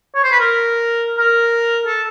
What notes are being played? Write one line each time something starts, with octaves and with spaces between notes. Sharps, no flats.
C#5
C5
B4
A#4
A#4
A4